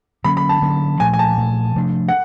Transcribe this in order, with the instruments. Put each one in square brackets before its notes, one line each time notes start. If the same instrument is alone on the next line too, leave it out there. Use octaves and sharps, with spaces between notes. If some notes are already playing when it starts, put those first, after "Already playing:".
[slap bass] D3 F#3 A#3 C#4 [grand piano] B5
[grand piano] B5
A5
[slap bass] D3 F#3 A#3 C#4
[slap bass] A#2 F3 A3 [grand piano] G#5
[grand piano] G#5
A5
[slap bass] A#2 F3 A3
C3 F3 A3 D4
[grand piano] F#5